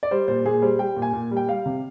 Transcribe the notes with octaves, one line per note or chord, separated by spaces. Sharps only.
D5
G3 C5
A#2 C5
A#2 G#4
G3 C5
G3 G5
A#2
G#5
A#2
G3
G5
G3 F5
C3